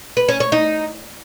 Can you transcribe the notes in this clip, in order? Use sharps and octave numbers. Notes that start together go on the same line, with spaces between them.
B4
C#4
C#5
D#4